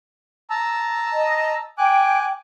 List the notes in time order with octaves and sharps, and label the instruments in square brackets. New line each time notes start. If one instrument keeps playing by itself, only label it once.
[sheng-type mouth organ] A5 A#5 E6
[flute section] D#5
[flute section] G5 [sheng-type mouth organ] G#5 D6 F#6